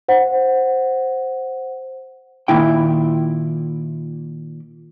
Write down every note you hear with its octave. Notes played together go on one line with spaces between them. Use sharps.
C5 F#5
A#2 D#3 E4 G5